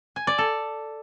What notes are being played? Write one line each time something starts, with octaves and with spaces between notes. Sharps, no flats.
G#5
D5
A4